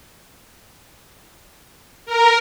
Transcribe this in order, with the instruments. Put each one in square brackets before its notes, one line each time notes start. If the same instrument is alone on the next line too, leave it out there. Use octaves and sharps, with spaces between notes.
[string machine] A#4